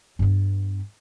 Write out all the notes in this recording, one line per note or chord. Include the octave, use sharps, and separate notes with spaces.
G2 B3